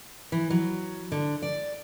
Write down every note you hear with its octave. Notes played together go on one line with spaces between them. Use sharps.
E3
F#3
D3
D5